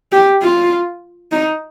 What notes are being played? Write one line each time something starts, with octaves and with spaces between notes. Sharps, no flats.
G4
F4
D#4